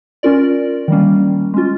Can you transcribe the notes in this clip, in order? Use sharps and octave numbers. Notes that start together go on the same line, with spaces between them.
C#4 F4 A#4 D5
D#3 G3 A#3 C#4
G#3 C#4 F4